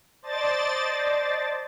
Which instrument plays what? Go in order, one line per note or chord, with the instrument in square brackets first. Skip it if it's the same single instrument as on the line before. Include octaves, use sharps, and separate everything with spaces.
[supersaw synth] C5 D5 D#5 A5 A6